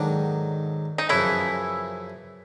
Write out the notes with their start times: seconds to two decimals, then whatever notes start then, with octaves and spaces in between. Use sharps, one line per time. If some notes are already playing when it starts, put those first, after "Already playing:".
Already playing: G#2 D3 D#3 F#3 D4
0.98 D#4
1.09 F#2 C#3 E3 F3 E4